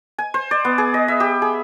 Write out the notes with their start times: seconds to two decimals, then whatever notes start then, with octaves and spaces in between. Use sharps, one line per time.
0.18 G#5
0.34 C5
0.51 D5
0.65 B3
0.78 G#4
0.94 D#5
1.08 E5
1.20 G4
1.42 G#4